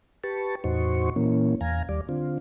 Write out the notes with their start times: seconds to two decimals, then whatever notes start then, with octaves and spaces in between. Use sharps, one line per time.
0.24 G4 B4 A5 C#6
0.64 E2 A2 D#4 F#4 C5 C#6
1.16 A#2 E3 A#3 C#4
1.61 E2 F5 G#5 A#5
1.89 D#2 G3 D5
2.09 D3 C4 F4